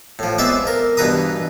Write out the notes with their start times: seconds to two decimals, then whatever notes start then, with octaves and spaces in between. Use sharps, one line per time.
0.19 A2 F3
0.38 G#3 B3 C4 D5 E5
0.67 A#4
0.97 G2 B2 E3 B4 A#5 D#6